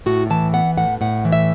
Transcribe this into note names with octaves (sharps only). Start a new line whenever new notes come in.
A2 F#4
E3 A5
B3 F#5
A2 F#5
A2 F#5
E3
E5